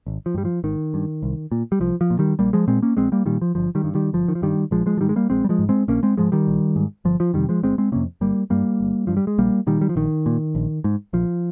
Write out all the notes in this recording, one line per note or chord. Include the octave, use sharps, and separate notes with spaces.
G#1
F3
G2 G3
F3
G#1 D#3
G2
C2
A#2
G3
C2 F3
F3
A#2
D#3 G3
A#1 G3 A#3
F3 G#3
A#2 G#3 C4
A#3 C#4
A#1 G#3 C4
G3 A#3
A#2 D#3 G3
F3
G1 F3
D#3 G3
G2
D#3 G3
G1 F3
D#3
F3
G2 D#3 G3
A#1 F3 G#3
F3 G#3
F3
G#2 D#3 G3
G#3
G3 A#3
A#1 G#3 C4
G3
F3 G#3
G#2
G#3 C4
A#1 A#3 C#4
G#3 C4
G#2 F3 G#3
D#3 G3
A#1
G#2
G1 F3
F3
F2 C3 D#3 G3
F3 G#3
G1 G#3 C4
G#3 C4
F2 C3 A#3 C#4
G1 G3 A#3
G2 G3 A#3
G1
G2 F3
G3
G#3
A#1 G3 A#3
A#2 D#3 G3
G3
F3
A#1 D#3
A#2
A#1
G#2
A#1 F3